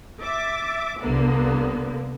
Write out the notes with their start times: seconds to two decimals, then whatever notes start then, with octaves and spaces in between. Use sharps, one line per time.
0.22 E5 D6 A6
1.00 C2 D3 A#3 B3